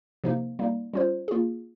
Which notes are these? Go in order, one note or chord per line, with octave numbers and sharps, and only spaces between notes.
C3 F3 A#3 D#4
G3 A#3 D#4
G3 C#4 F4 C5
A#3 F4 G#4